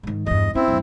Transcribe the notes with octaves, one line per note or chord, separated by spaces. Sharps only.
G#2 D#3
E2 G2 D#5
C4 C#4 E4
E2 G2